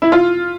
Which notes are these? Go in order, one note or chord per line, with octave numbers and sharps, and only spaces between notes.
E4
F4